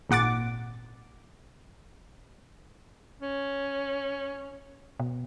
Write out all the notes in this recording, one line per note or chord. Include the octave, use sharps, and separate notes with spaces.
G#1 A#2 F#5 D6 A6
C#4
B2